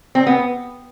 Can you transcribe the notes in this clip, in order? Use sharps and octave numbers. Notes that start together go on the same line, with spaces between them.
C4
B3